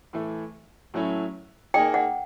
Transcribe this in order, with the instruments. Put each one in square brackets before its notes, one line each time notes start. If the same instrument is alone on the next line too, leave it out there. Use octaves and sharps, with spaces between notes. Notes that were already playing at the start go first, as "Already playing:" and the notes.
[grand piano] A2 E3 A3
A2 F#3 A3 C#4 E4
[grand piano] A#3 D#4 G#4 [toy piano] G5
[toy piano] F#5